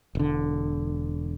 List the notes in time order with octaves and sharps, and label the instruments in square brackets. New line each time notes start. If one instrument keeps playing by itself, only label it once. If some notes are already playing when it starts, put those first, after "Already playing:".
[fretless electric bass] E1 D3